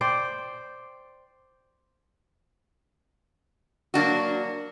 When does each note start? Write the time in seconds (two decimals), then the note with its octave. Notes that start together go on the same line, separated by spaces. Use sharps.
0.01 C5 D5 G5
3.94 F#3 A#3 D4 F#4